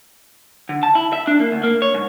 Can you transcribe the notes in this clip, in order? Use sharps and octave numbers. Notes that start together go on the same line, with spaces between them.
D3
A5
E4
E5
D4
A#3
D2
A#3
C#5
G#2